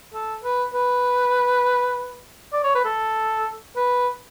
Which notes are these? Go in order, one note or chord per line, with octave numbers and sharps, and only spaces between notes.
A4
B4
B4
D5
C#5
B4
A4
B4